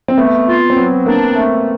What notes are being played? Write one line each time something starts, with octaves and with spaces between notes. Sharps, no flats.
C4
A3 B3
F4
C4
F#3 B3
A#3 D4
A3